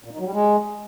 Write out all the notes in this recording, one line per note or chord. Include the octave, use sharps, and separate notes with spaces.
A#2
D#3
F#3
G3
G#3